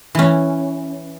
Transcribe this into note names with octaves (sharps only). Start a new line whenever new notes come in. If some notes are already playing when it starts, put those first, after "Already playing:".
E3 C#4